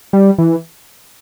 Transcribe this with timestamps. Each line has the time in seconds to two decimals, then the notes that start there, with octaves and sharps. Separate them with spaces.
0.13 G3
0.38 E3